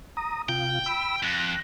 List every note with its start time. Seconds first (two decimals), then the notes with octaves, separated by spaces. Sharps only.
0.17 A#5 D#6
0.49 C3 F4 G5
0.86 B5 E6
1.23 F2 F#6